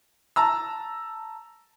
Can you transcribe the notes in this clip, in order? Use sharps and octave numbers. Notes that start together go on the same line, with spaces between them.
A5 A#5 E6